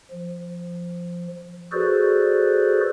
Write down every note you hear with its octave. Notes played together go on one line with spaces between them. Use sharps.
F3
F#4 G#4 A4 B4 C5 D5